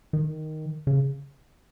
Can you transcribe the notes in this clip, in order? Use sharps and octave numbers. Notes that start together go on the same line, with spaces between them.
D#3
C#3